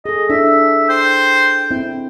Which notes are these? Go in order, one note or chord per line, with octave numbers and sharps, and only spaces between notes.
G#4 A4 D#5
D4 E4 A4 E5
C5 G5
C4 E4